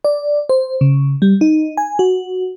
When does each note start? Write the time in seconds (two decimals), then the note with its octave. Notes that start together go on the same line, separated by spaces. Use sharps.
0.04 D5
0.49 C5
0.81 C#3
1.22 G3
1.41 D#4
1.77 G#5
1.99 F#4